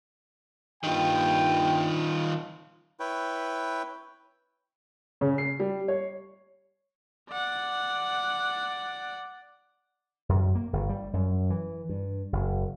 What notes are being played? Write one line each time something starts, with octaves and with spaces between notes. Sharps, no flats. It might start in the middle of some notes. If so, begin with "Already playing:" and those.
G2 D#3 A#3 F4 G5
E4 B4 C#5 G5
C#3
C7
G3
C#5
D5 F#5
F#2
A#3
G1
G3
F#2
E3
G2
F#1